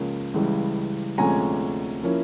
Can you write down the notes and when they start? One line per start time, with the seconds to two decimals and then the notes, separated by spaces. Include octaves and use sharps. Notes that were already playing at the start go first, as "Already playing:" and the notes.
Already playing: C#2 C#3 F3 A#3 C#4
0.34 C#2 C#3 E3 G3
1.18 D2 C3 F3 G#3 C#4 G#5 A#5
2.03 F3 A#3 C#4 E4